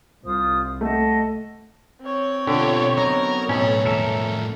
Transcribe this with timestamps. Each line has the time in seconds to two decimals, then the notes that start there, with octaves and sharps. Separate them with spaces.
0.24 C2 F4 C5 D#6
0.81 A3 D#5 F#5 A5
2.02 C4 C#5
2.47 B2 D3 F4 G4
2.97 F#3 B3 D#4 A#4
3.49 B1 A2 C#4 A4
3.85 F2 A2 A4 A#4 E5